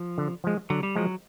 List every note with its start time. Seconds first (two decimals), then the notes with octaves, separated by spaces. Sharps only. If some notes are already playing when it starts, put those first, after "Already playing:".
Already playing: F3
0.18 D3
0.44 F3 G#3
0.70 D3 F#3
0.83 G3
0.96 F3 F#3 G#3